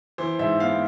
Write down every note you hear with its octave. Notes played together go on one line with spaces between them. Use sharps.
E3 C5
G#2 E5
B3 F5